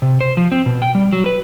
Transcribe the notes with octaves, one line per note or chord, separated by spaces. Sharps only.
C3
C5
F3
C4
B2
G5
G3
F#3
B4